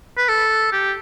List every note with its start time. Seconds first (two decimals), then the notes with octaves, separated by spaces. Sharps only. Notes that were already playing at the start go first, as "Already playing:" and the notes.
0.17 B4
0.28 A4
0.72 G4